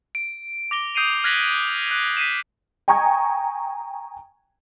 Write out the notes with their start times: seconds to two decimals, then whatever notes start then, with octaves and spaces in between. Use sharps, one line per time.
0.15 D7
0.71 D6 A#6 G7
0.95 D#6 G6 C7 D7 D#7 F7
1.24 F6 F#6 G#6 A#6 B6 F#7
1.91 F#6
2.17 B6 C7 D#7 E7
2.88 G5 G#5 A#5 C#6 D#6 G#6